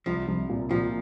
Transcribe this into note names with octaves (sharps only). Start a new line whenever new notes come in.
C2 F3
C2
A#2
A#2 F3